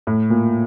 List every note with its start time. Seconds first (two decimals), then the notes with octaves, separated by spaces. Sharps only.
0.07 A2
0.30 A#2